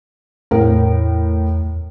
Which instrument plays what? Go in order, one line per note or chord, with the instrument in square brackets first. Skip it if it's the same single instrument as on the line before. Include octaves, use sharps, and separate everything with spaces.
[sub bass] E2 [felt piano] A2 A#4